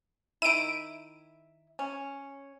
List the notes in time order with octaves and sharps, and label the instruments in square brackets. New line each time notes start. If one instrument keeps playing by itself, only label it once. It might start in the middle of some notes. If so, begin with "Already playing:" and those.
[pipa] D#3 E4 [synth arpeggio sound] D7 D#7
[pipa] C#4